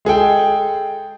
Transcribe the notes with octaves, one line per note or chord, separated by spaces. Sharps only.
G#3 G#4 A4 G5